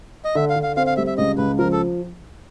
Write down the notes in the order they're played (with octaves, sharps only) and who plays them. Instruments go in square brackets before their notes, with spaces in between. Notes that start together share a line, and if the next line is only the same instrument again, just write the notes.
[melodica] D#5
[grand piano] D3 [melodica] E5
[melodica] F5
[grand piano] D3
[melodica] F5
[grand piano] C4 [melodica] F5
[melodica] F5
[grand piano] G3 [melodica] E5
[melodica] E5
[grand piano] C#2 [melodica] D#5
[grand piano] C#2 [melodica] B4
[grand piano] F3 [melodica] A#4
[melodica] A4